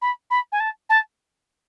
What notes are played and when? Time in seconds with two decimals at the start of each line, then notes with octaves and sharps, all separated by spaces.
0.02 B5
0.30 B5
0.52 G#5
0.60 A5
0.89 A5